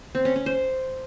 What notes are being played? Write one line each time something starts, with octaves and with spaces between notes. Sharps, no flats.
C4
C#4
C#4
C5